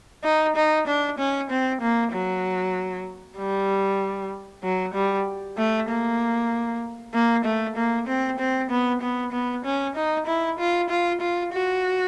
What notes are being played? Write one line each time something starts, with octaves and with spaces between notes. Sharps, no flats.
D#4
D#4
D4
C#4
C4
A#3
F#3
G3
F#3
G3
A3
A#3
A#3
A3
A#3
C4
C4
B3
B3
B3
C#4
D#4
E4
F4
F4
F4
F#4